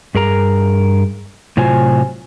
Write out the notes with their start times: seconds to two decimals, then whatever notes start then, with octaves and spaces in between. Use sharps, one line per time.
0.15 G2 G#4 A#4 A#5
1.57 A2 C3 F#3 F4 C5 G#5